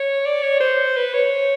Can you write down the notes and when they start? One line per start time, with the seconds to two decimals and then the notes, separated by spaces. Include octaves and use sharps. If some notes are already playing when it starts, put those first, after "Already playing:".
Already playing: C#5
0.26 D5
0.43 C#5
0.60 C5
0.96 B4
1.14 C#5